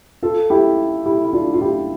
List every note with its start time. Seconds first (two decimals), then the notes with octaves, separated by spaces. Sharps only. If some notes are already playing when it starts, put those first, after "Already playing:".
0.23 F4 A4
0.50 E4 G4
1.06 E4 G4
1.24 E4
1.33 D4 F4
1.54 F4
1.61 E4 G4